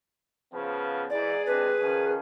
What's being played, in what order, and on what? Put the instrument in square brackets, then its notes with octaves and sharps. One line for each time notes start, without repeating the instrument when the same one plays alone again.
[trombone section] C#3 F3 B3
[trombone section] G#2 E3 [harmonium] G#4 [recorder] D5
[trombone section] C3 G#3 D4 [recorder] B4
[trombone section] D#3 F3 C#4